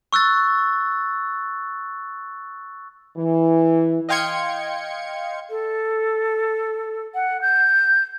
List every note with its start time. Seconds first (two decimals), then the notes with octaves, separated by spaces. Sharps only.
0.13 C#6 E6 F#6 A6
3.16 E3
4.09 D#5 F5 G5 C6 G#6 C#7
5.49 A4
7.15 F#5
7.42 G6